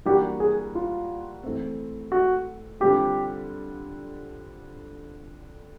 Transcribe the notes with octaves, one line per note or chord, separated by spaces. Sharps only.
E3 G3 A#3 D4 F#4 G4
G#4
F4
E3 A3 C4
F#4
D3 G3 C4 F4 G4